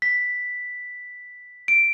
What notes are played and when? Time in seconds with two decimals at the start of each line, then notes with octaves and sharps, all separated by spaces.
0.02 B6
1.68 D7